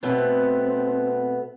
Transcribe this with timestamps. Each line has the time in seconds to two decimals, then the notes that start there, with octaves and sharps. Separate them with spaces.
0.03 B2 A3 B3 C4